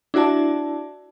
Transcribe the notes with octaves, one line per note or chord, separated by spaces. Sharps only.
D4 E4 F#4 D5 A5